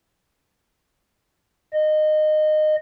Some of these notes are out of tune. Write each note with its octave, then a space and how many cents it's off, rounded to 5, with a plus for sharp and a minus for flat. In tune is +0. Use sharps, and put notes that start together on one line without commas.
D#5 -20